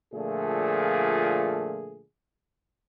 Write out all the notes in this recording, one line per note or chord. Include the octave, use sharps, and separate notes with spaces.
A#2 D3 F3 A3 G#4